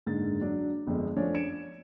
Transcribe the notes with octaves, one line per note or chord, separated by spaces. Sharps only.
F#1 G#2 D3 A6
F#3 D4
G1 F2 G#3 D#5
F3 A3 C#4 D4 C#5 D5
G#6 C#7 D7 E7